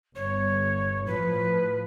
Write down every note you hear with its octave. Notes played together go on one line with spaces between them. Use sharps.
G1 C#5
A2 F3 B4